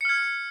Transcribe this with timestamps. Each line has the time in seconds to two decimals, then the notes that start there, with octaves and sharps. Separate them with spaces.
0.01 C#7
0.05 F6
0.09 G#6